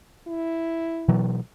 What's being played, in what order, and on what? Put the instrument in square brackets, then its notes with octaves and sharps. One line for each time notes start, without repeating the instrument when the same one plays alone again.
[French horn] E4
[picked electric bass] B2 E3 F#3